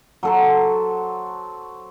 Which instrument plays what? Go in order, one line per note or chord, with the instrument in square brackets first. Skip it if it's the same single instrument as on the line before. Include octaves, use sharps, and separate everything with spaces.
[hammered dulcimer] F#3 A4 C5